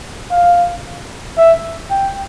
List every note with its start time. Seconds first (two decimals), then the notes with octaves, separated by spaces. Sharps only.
0.31 F5
1.37 E5
1.90 G5